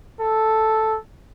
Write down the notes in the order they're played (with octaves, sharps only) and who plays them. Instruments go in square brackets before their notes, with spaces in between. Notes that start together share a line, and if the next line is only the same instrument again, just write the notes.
[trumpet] A4